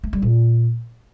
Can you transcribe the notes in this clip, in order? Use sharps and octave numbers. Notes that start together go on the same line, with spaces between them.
A3
G3
A#2